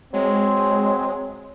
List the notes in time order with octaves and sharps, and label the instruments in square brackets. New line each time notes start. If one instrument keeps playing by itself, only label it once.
[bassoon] F#3 [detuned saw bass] G#3 [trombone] C4